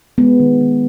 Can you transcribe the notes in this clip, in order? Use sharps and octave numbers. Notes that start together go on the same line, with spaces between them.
G#3 B3
D#3
D#3